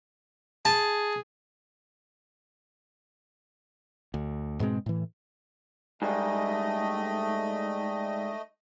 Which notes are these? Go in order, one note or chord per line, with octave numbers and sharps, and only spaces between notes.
G#4 A5
D2
G#2 B2 G#3 C4
A2 E3
G#2 G3 A3 D#5